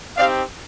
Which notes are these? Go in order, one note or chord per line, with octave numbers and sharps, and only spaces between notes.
C4 D#4 G4 D5 F5